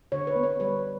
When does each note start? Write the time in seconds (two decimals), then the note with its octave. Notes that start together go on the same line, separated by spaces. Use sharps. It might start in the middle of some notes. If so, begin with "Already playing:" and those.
0.12 D3 C#5
0.27 B4
0.36 B3
0.43 C#5
0.60 G3 B4